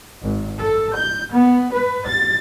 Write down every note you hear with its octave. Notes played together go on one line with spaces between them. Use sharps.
G#1
A4
G6
B3
B4
A6